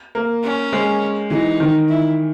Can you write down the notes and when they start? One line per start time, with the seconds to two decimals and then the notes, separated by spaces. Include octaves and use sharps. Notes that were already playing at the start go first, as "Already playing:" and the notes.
0.15 A#3
0.43 C#4
0.73 G#3
1.30 E3 D#4
1.60 D#3
1.89 E4